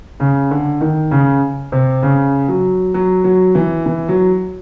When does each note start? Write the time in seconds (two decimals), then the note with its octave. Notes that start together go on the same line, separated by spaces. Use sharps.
0.20 C#3
0.51 D3
0.81 D#3
1.11 C#3
1.72 C3
2.03 C#3
2.48 F#3
2.94 F#3
3.24 F#3
3.55 E3
3.86 E3
4.08 F#3